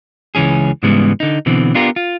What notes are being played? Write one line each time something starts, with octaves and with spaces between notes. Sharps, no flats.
C#2 E3 C#4 G#4
G#2 C#3 E3 G3 G#3 B3
D3 D#4
B2 D3 E3 C4
B3 D4 F4 G4 A#4
F4